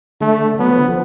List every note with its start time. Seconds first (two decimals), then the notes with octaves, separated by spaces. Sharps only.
0.21 D3 A3
0.59 F#3 B3
0.69 F3
0.79 D3
0.88 F3